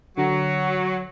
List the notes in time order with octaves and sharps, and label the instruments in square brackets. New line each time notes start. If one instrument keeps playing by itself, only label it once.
[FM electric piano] D3 [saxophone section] F#3